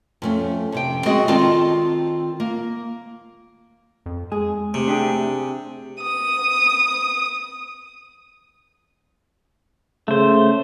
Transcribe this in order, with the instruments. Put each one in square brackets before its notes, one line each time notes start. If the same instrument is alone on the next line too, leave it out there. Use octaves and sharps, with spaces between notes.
[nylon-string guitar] F2 A3 C#4
F2 C3 G5
G#3 C4 F#4 G#4 D#5
D#3 C4 F4 A4 D5 A5
A#3
[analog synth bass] F2
[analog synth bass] G#3 [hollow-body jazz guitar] G#4
[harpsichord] C3 [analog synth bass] A3
[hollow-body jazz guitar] D4 G4 G#4
[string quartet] D#6
[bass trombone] C#3 [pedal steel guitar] A3 C5